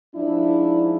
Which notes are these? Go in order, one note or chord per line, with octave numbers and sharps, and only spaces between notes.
G#2 F3 D4 E4